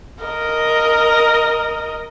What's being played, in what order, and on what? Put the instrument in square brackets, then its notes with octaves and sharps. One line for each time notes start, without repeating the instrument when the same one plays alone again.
[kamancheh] A#4 D#5